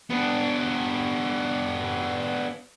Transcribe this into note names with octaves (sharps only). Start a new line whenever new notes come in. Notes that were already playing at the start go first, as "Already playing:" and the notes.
B3 D4